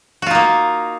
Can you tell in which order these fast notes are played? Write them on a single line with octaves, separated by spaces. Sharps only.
F#4 F4 D#4 A#3